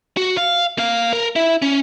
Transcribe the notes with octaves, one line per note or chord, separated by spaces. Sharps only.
F#4
F5
A#3 F5
A#4
E4
C#4